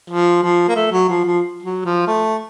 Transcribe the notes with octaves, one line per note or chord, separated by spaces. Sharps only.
F3
F3
A#3
A3
F#3
F3
F3
F#3
F3
A3